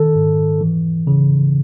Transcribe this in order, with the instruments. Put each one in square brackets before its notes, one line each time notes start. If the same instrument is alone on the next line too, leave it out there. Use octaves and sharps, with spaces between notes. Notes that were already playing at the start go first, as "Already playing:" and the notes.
Already playing: [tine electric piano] D#3 A4
G#2
E3
C#3